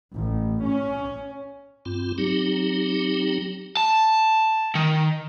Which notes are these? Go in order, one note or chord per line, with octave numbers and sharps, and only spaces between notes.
A1
C#4
G2 C4 F4
F#3 C4 D#4 G4
A5
D#3